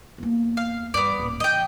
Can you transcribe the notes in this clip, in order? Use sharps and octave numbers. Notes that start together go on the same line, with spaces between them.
E2 A#3
F5
G2 E3 B3 D5
D#1 A1
E3 D#5 G5